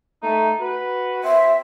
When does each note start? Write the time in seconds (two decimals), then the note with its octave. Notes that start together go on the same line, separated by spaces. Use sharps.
0.23 A3 D#4
0.61 F#4 B4
1.24 C4 E5